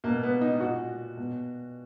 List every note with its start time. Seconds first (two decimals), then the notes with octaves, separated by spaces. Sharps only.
0.04 B2 A#3
0.23 B3
0.41 D#4
0.60 A#2 F#4
1.17 B2